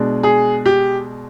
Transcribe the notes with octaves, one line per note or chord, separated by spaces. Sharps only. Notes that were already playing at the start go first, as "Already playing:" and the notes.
Already playing: B2 G#3 D4
G#4
G4